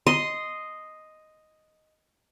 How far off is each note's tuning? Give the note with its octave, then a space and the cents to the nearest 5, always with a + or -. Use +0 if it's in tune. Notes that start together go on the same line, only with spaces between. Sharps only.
D#5 +0 C6 -5